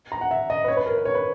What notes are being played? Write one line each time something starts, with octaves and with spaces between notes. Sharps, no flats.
A#5
F#5
E5
D#5
B4
C#5
B4
A#4
B4
C#5
B4